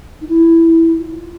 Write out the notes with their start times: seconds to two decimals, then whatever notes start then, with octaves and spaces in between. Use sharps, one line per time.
0.21 D#4
0.27 E4
0.99 F4